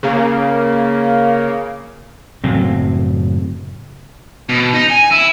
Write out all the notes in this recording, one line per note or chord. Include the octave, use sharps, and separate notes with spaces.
C#3 A#3
F#1 A2 F#3 C4
B2
D#4
G#5
E4